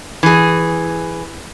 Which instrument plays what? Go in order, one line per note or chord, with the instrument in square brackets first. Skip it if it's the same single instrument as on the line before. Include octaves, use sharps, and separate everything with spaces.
[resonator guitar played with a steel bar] E3 G#4